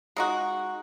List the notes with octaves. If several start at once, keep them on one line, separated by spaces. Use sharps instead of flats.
G#3 D#4 F#4